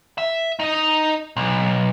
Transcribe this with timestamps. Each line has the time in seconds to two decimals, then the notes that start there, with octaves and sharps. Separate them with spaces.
0.18 E5
0.60 D#4 D#5
1.36 B1